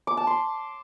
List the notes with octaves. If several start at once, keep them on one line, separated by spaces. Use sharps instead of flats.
D6
A5
C6